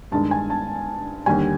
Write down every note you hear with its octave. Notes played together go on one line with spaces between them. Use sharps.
G2 D#3 G#3 A5
G#5
A5
D#2 D3 G3 G#5